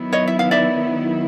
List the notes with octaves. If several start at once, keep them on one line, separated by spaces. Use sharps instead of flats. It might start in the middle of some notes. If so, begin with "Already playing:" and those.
Already playing: D#3 F#3 B3 E4
C#5 D#5
E5
F5
D5 E5